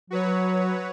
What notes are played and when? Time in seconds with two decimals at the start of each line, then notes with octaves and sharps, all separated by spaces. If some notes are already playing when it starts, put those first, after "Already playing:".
0.10 F#3 F#4 B4 C#5